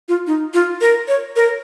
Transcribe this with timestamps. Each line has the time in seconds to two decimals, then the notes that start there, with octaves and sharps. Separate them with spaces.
0.08 F4
0.27 D#4
0.54 F4
0.81 A#4
1.08 C#5
1.36 A#4